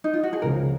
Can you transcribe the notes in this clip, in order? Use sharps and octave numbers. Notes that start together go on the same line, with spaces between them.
D#4
F4
F#4
G#4
C#2 C#3 F3 A#4